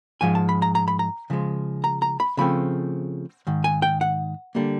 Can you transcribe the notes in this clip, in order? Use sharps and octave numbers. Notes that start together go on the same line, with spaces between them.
G#2 F3 G#3 G#5
A5
B5
A#5
A#5
B5
A#5
C#3 F3 G#3
A#5
A#5
B5
C#3 F3 A3 C4 B5
G#2 D#3
G#5
G5
F#5
D3 G3 A#3